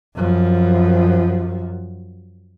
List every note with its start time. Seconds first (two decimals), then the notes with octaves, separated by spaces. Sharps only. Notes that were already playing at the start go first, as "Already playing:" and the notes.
0.15 F#2 F3